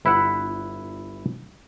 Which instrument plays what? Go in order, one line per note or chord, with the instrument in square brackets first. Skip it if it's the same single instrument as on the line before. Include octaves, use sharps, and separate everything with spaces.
[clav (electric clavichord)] G1 E4 B4 E5 F#5